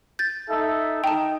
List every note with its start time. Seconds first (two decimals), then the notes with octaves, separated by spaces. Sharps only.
0.19 G6 A6
0.50 D#4 A4 E5
1.04 D#4 G5 A5